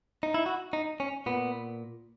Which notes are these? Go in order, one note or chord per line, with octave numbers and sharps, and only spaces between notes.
D#4
E4
F#4
D#4
C#4
A#2 B3